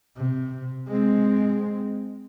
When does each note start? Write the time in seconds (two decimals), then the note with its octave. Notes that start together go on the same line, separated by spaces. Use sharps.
0.17 C3
0.88 G#3 C4